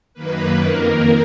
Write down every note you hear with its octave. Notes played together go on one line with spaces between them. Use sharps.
F#2 D#3 A#3 B4
F2 D#3 A#3 A#4